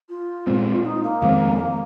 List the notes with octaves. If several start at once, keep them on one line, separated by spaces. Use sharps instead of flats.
F4
A#2 G#3 C4
D#4
A#3
F2 D#3 G#3 C4
G#3
A#3